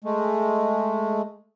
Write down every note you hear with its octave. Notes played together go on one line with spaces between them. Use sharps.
G#3 A3